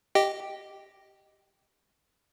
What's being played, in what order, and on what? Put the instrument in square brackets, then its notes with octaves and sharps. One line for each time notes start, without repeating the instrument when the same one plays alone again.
[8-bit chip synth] G4 D#5 G5